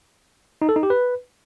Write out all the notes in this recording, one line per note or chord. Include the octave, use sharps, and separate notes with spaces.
D#4
A4
D#4
G4
B4